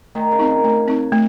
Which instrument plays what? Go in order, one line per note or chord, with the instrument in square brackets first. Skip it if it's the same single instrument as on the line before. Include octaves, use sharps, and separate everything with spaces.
[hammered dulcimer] D#3 [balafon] A3
[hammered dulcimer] C#3
[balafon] C4 D#4
[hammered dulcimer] D#3
[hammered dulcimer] C#3 [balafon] A3
[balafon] C4 D#4
A3